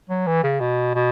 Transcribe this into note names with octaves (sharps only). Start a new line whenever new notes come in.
F#3
E3
C#3
B2
B2